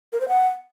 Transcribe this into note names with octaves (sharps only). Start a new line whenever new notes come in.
A#4
C5
F#5